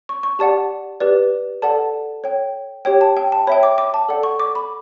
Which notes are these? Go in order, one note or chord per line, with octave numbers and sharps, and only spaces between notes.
C#6
C#6
G4 D5 F#5 A5
G4 B4 D5
A4 D5 F#5 A5
C#5 G5
G4 C#5 G5
A5
G5
A5
C#5 E5 G5 B5
D6
D6
A5
A4 D5 F#5
C#6
D6
B5